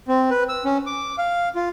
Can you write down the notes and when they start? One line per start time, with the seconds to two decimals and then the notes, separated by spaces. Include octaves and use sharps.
0.08 C4
0.31 B4
0.49 E6
0.65 C#4
0.86 D6
1.18 F5
1.55 F4